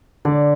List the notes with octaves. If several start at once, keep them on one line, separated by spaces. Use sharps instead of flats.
D3 D5